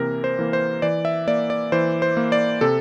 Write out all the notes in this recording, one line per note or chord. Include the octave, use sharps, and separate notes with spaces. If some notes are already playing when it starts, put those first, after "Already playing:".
Already playing: C3 E3 A#3 A#4
C5
E3 A#3
C5
E3 D5
E5
A#3 D5
D5
E3 C5
C5
A#3
D5
C3 A4